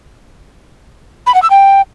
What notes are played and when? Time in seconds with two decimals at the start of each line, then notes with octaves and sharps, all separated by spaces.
1.27 B5
1.34 F#5
1.42 E6
1.50 G5